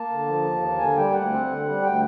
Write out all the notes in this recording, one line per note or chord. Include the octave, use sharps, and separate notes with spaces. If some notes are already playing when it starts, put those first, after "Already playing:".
Already playing: A#3 A5
D3
F3
D#2
A#3
D3 G#5
G3 G5
D2 F#5
C4
D3
G3
D2 G5